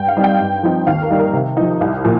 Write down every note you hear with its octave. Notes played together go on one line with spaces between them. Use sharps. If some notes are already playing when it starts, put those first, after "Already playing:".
Already playing: G2 G5
F5
G3 C4 D#4
G5
G2
F3 C4 D#4
D#2 F5
A#4
D#3 G3 D#4
A#4
C3
F3 D#4
C2
A#2 F3